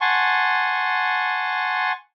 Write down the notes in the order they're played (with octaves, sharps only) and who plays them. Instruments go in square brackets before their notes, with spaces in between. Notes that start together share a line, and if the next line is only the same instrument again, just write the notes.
[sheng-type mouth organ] F#5 G#5 A5 C6 C#6